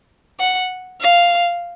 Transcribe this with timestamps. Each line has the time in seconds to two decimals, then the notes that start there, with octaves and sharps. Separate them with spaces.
0.40 F#5
1.01 F5